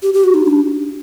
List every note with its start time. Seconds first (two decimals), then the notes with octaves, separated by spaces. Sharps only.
0.03 G4
0.14 G4
0.24 F#4
0.34 D#4
0.45 D4